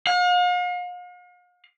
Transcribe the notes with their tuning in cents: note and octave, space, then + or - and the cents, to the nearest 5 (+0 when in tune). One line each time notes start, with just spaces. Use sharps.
F5 +45